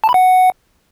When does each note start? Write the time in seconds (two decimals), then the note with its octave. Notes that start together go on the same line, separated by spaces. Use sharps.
0.04 A5
0.09 B5
0.14 F#5